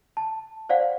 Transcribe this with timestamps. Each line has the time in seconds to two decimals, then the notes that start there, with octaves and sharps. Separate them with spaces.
0.17 A5
0.69 C5 D5 F5 F#5